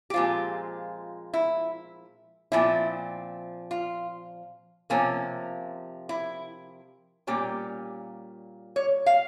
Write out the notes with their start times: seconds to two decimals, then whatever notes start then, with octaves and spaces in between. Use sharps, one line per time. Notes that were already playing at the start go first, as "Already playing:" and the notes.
0.10 G4
0.14 A#2 F3 G#3 C4 F4
1.34 E4
2.52 A#2 F3 C4 E4
3.71 F4
4.90 C3 F3 A#3 C#4
6.09 E4
7.27 A#2 G3 A#3 C#4 G4
8.76 C#5
9.06 F5